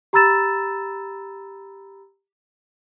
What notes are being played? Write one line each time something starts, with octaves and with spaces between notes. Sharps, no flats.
G4 A#5 B5 E6 A6 E7